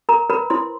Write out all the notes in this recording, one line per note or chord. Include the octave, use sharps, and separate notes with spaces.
A#4 A#5
A#4 B4 B5
E4 C5 C6